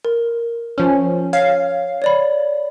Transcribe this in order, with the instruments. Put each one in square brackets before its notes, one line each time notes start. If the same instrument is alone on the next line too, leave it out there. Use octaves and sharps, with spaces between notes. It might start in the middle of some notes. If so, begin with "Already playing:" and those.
[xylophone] A#4
[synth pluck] F3 C#4
[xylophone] C#5 [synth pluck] F5
[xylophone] C#5 D5 B5